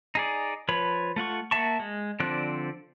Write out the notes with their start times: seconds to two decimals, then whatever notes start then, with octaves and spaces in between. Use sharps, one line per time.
0.15 D#4 G#4 D5
0.69 F3 B4 C#5 B5
1.16 A3 F4 F#5 C#6
1.51 A#3 F#4 E5 A5 C#6
1.80 G#3
2.20 D3 F3 C4 D5 F#6